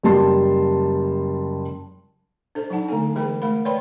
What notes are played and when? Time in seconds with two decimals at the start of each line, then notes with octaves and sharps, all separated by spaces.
0.03 F#1 G3 A5 C6
2.55 D4 A4 C5
2.70 F#3 D4 D#4 F#5 A5
2.88 D3 A3 B3 A4 G#5
3.15 E3 G#3 G#4 A#4 G5 B5
3.42 A3 A#4 F#5 B5
3.65 B4 C#5 D5 G5 B5 C6